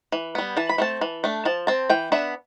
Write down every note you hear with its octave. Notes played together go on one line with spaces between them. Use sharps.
E3
G3 B3
E3 A5
B5
A3 C4 A5
E3
A3 D4
F3 A5
C4 A5
E3 G5
B3 D4 E5